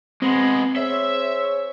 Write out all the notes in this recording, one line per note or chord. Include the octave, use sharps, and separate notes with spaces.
G#3 B3 C4
G#4 C5 C#5 E5